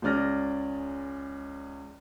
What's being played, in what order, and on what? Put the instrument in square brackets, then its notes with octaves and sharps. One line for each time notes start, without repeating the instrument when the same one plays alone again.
[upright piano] C#2 G#3 C#4 D5 F6 A#6